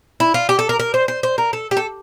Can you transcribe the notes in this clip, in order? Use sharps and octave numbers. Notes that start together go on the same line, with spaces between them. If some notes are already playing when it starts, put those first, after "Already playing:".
E4
F4
G4
A4
A#4
A#4
C5
C5
C5
A#4
A4
G4
A4